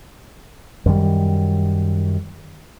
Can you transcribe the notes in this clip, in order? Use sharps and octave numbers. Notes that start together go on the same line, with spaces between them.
F#2 D#3 G3